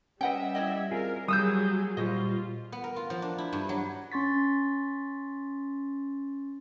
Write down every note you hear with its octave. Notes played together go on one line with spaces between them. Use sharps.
G3 C#4 B4 D#5 E5 F#5 G5
E4 D5 D#5
C4 F4 G#4 A#4
F#3 G3 A#3 G#4 D#6 E6 G6
A#2 G3 F4 F#4 C5 D#5
B3
A#4
F4
F3
D4
E4
G2
F#3
C#4 C6 C#6 A6 B6